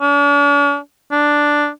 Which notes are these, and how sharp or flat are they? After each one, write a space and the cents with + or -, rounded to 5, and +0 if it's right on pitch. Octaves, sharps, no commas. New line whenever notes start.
D4 -45
D4 +0